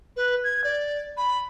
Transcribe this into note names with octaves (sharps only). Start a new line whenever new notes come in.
B4
G#6
D5
B5